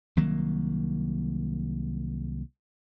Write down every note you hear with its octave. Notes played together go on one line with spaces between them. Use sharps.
C2 D#3 F#3 A#3